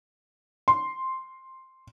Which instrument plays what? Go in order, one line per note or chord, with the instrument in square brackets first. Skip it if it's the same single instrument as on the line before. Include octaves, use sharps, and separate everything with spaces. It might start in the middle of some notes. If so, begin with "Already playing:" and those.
[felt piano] C6